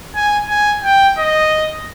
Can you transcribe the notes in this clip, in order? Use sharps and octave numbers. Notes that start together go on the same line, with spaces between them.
G#5
G#5
G5
D#5